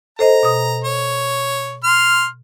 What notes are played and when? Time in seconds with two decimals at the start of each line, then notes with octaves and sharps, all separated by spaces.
0.19 A4 C5 D#5 A#5
0.43 B2 D#6
0.84 C#5
1.84 C6 F6